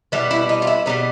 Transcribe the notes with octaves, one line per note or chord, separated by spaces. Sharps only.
B2 G3 B3 E4
E4
D#4
F4
E4
B2 G3 B3 D#4